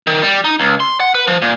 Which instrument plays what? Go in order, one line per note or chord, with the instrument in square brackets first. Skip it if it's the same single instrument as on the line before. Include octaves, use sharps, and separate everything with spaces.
[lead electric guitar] D#3
G3
D#4
C#2
C6
F#5
B4
F3
A#2